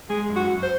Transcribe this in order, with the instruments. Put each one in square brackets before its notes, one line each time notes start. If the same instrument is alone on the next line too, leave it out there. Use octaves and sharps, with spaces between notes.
[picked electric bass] G#3 [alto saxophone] G#4
[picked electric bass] F#2
[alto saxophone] F#4
[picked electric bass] F#2
[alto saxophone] C5